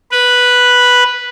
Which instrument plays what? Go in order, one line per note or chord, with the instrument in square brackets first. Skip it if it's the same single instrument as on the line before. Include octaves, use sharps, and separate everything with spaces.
[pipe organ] B4